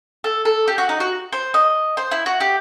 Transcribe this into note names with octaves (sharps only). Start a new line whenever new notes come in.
A4
A4
G4
F#4
D#4
F#4
C5
D#5
C5
E4
F#4
G4